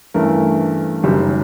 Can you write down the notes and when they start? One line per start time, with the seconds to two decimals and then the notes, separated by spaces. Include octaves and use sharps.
0.14 G2 E3 A3 C#4 A#4
1.03 F#1 F#2 D#3 G3